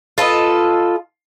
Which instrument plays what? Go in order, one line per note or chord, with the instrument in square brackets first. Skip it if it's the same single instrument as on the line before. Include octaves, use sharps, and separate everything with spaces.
[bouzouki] F4 A4 B4 D#5